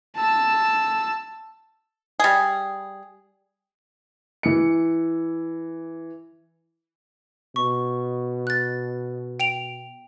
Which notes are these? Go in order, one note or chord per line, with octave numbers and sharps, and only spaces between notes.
A5 E6
G3 G#4
E3 C#7
B2 C#6
F#6 A6
G5 D7 F7